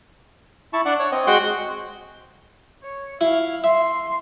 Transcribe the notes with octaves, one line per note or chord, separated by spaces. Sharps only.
E4 A5 C#6
D4 D5 F#5
C#5
C4 D#5
G#3 F#4 F#5 G5 C6
C#5
E4 F5
E5 C6